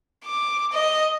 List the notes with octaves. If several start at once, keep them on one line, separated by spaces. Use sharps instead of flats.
D6
D#5